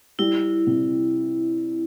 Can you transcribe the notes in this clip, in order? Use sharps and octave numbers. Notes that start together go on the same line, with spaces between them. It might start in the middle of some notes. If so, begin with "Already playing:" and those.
G3 E4
C3